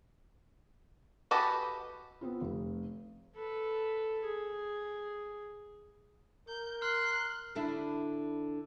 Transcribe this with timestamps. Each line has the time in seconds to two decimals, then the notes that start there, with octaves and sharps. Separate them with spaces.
1.31 F#4 G4 A4 B4 D#5
2.21 B3 C4 F4
2.41 F1
3.35 A4 B4
4.24 G#4
6.49 A#4 G6
6.82 C6 F6 F#6
7.55 D3 D4 E4